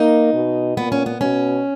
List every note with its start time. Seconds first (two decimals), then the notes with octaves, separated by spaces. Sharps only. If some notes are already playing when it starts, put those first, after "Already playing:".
Already playing: A#3 D#4
0.33 B2
0.77 A#2 B3
0.92 C#4
1.06 B3
1.21 B2 C#4